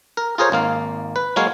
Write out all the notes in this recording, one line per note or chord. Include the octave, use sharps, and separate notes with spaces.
A#4
F4 G#4 A#4 C5 C#5
G#1 A#3 F5
B4
F#3 G#3 A#3 C#5 F5